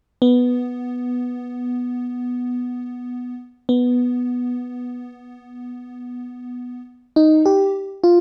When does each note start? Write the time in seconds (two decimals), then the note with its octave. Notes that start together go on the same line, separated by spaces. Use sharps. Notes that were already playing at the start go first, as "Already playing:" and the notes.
0.22 B3
3.69 B3
7.16 D#4
7.46 G4
8.04 F4